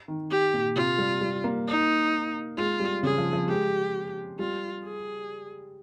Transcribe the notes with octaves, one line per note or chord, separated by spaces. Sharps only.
D#3
G4
A#2
C3 F4
G3
G3
A#3
D#4
G#3 F4
G3
C#3 G#4
F3
F3
G#3 G4
G3 F4
G#4